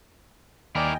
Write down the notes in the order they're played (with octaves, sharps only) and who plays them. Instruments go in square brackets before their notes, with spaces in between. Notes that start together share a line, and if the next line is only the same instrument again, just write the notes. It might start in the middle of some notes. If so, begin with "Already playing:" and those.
[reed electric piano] D#2 [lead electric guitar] E4 A#4 [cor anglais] D5 [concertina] D#5 G5 G#5